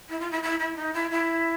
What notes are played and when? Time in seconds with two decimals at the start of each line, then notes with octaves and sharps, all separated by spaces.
0.09 E4
0.20 F4
0.31 E4
0.43 E4
0.59 E4
0.76 D#4
0.94 E4
1.11 E4